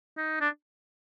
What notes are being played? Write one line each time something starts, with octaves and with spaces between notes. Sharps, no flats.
D#4
D4